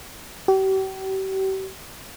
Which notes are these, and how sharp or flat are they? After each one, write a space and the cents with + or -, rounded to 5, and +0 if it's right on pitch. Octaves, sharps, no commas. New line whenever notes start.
G4 -40